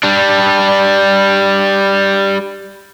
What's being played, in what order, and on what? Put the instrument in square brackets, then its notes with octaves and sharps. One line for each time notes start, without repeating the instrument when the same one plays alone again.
[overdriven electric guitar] G3 D4